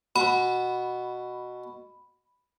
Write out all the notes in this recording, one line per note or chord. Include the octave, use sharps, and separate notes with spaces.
B2 B5